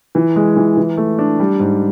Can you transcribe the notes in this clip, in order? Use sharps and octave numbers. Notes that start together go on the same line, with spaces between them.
E3
G#3
E3
E3
A3
D4
G3
G#2